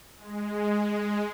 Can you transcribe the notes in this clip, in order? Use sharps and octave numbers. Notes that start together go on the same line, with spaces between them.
G#3